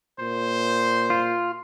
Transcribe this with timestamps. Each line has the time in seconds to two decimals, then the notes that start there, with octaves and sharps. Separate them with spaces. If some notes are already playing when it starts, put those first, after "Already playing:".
0.20 A#2 C5
1.10 F4